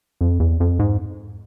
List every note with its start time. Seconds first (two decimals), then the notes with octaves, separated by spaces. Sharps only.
0.21 F2
0.40 E2
0.60 F2
0.79 G#2